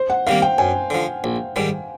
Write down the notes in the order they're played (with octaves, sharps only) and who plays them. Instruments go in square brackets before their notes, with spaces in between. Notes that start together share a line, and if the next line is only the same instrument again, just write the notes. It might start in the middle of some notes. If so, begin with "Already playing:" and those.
Already playing: [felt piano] C5
F#5
[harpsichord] C3 D#3 G3 A#3 [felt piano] F5
[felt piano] G5
[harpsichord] F#2 [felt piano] G#5
[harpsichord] D3 F3
A#1
G#2 D#3 G3